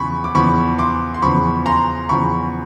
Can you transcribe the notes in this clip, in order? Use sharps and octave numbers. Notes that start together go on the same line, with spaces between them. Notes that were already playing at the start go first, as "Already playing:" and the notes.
Already playing: E2 C#3 F3 B5 C#6
D6
E2 C#3 F3 B5 C#6
C6 D6
C6
E2 C#3 F3 B5 C#6
A#5 C6
E2 C#3 F3 B5 C#6